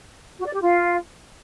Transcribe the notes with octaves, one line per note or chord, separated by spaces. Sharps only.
F#4
D5
G4
F4